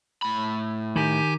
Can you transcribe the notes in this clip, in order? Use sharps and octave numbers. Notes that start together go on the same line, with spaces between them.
A2 B5
D#3 G4 G#5 G6